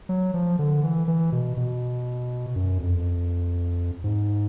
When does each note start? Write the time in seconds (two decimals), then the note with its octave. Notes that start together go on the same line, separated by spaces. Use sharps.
0.09 F#3
0.34 F3
0.59 D3
0.83 E3
1.08 E3
1.32 B2
1.57 B2
2.56 F#2
2.80 F2
4.04 G#2